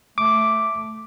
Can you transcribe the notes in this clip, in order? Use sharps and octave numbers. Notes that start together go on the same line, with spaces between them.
A3 D6